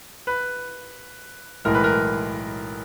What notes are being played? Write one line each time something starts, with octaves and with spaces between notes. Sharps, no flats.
B4
B1 A2 E3 G#3 A#4
B4
A#4